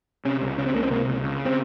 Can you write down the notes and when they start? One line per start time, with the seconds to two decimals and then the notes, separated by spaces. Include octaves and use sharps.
0.25 C3 C#4
0.41 C#2
0.58 C#3 C#4
0.66 C4
0.74 C#2 A#3
0.83 C4
0.91 C3 A#3
1.07 C#2
1.24 C#3
1.46 C4